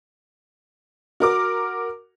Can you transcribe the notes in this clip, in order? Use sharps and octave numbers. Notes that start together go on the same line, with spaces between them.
F#4 A#4 D6